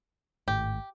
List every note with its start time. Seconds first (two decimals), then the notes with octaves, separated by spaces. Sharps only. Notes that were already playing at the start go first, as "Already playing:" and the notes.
0.48 G#1 A2 G4